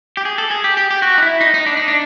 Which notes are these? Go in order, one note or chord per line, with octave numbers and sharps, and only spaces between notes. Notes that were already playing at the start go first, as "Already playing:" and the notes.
G4
G#4
A4
G#4
G4
G4
G4
F#4
D#4
E4
D#4
D#4
D4
D#4
D4